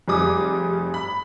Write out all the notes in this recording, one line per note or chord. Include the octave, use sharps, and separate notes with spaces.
F1 G3 G#4 D6 D#6
B5